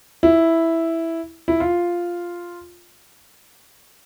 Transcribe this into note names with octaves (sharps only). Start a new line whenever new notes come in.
E4
E4
F4